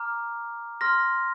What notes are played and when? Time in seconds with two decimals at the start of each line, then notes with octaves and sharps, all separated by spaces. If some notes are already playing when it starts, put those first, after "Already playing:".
Already playing: A#5 D6 F6
0.81 C6 F6 A#6